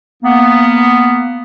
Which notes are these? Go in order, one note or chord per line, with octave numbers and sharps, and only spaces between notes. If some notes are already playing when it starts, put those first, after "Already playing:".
A#3 B3